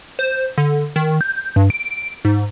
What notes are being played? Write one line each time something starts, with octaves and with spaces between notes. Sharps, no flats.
C5
D3
D#3
G6
G2
D7
G#2